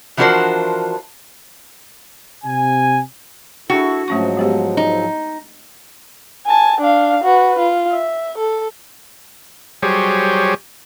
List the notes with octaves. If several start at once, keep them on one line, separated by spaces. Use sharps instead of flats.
E3 F3 D4 F#4 A#4 C5
C3 G#5
D4 E4 F#4 G#4 A4 G5
G#2 F3 F#3 A3 C#4 C#6
G#3 B3 G4
D#4
G#5 A5
D4 F5
F#4 B4
F4
E5
A4
F#3 G3 G4 G#4 C5 C#5